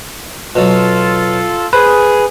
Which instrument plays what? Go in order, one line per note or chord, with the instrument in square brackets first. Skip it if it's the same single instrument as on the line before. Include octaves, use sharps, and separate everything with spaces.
[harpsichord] B2 F#3 [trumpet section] F4 A4
[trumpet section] G#4 [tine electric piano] B4 [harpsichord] C5